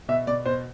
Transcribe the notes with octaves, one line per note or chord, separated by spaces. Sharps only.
B2 E5
B2 D5
B2 C5